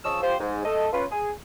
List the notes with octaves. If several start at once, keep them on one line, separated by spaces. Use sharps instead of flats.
C#3 F3 A5 C#6 D#6 E6
F4 G4 C5
G#2
A3 A4 D#5
C#4 F4 B4
G#4